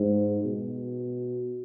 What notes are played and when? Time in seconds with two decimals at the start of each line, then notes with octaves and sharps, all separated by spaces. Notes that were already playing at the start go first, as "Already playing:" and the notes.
Already playing: G#2
0.44 B2